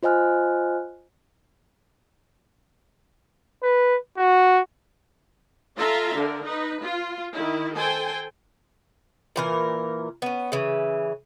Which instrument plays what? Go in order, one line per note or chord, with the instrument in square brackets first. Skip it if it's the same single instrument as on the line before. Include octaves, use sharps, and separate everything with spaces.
[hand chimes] F4 C5 D#5 G#5 F6 F#6
[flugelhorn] B4
F#4
[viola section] F4 A4 E5 F5 A#5 C6
D3 A#4
D#4 B4
F4
D#3 E4
A4 C5 G5 G#5
[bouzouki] A#2 E3 A#4
B3 C#4
C#3 E3